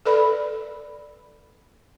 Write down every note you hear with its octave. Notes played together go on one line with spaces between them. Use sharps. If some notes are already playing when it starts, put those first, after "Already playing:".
A4 B4 D5 B5